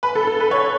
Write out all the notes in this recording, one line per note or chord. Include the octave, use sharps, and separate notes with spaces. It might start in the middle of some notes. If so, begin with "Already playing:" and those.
B4
A4
A4
B4
C#5